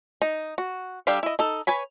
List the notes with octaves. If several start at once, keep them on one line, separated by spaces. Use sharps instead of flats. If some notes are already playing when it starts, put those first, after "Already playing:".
D#4
F#4
G3 D4 G4 A4 F5
E4 D#5
D#4 A4
B4 C#5 G#5 B5